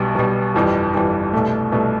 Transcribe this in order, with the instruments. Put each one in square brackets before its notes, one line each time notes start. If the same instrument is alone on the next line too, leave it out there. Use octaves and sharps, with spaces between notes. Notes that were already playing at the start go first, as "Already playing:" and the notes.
Already playing: [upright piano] B1 B2 G3
B1 B2 G3
G1 F2 E3 G3
G1 F2 E3 G3
C2 B2 A3
C2 B2 A3